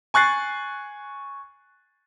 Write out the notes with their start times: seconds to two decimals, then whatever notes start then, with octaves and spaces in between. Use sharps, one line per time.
0.14 G#5 C#6 F#6 A6 C7